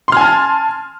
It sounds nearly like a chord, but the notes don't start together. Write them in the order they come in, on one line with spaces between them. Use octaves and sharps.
C6 F6 G#5 A5